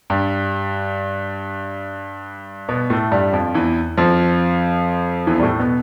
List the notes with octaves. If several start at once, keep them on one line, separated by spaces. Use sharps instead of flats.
G2 G3
B2 B3
A2 A3
G2 G3
F2 F3
E2 E3
F2 F3
E2 E3
G3
A2 A3
B2 B3